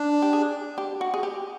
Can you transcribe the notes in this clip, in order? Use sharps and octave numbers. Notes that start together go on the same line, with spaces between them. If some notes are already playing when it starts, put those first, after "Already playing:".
Already playing: D4
G4
G#4
G4
F#4
G#4
G4